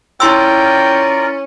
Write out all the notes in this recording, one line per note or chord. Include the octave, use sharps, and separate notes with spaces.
C#4 E4 F4 A#4 D5 G5 C6 E6